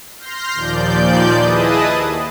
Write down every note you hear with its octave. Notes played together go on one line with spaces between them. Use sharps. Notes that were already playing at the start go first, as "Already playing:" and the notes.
C6 F6 G6 A#6 C7
D#2 A#2 F3 D5 G6
E4 G#4 B4 D#5 A5 D#6
D#2